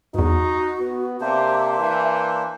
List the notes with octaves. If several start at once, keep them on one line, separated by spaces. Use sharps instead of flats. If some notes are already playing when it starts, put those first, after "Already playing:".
E2 G2 D#4 F#4
B3
C3 A#3 D4 C5 E5
E3